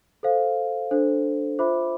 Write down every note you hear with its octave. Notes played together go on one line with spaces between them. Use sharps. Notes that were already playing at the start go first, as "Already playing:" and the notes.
A4 C5 F5
D4 A4 C5
F4 C5 E5 B5 D6